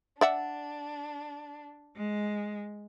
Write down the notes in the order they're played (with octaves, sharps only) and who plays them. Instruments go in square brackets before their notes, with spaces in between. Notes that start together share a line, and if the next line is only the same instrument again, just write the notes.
[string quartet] D4 [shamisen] D5 E5 F#5
[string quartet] G#3